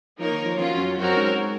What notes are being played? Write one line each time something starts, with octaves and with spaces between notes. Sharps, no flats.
F3 A#3 D#4 A#4 C#5
D#3
F3
F3 F#3 C#4 F4
F#2
F#2 C4 F#4 A#4 C#5
G#2